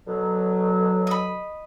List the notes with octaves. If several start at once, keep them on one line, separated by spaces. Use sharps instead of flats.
B2 D3 F#3
D#5 B5